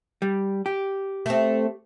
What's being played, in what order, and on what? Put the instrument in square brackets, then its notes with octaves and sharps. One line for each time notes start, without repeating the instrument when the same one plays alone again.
[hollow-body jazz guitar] G3
G4
[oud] A3 C4